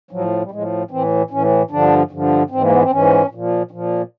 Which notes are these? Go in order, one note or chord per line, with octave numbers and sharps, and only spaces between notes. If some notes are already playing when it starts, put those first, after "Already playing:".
A2 F3 F#3
G3
A2 F3 G#3
A2 E3 C4
A2 E3 C#4
G2 D3 F3 D4
G2 D3 F3
G#2 E3 C4
A#3
B3
C4
G#2 E3 C#4
A#2 F3
A#2 F3